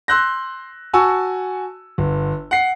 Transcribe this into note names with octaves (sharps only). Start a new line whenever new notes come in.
C6 E6 F#6 G6 A#6
F#4 G#5 A5 C#6 E6
G1
F#5 C7